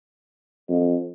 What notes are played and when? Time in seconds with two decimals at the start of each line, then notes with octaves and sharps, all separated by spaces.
0.69 F2